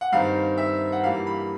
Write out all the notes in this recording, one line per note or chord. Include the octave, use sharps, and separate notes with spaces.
F#5
G2 D#3 G3 C4 D#4 F5
E5
F#5
G2 E3 G3 A#3 F5
B5